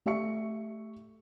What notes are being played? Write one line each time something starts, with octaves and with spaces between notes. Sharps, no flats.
A3 G4 E5 C#6 C#7